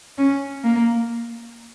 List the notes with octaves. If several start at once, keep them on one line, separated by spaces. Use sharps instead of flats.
C#4
A#3